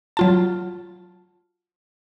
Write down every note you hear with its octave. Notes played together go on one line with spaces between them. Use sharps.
F#3 F4 A5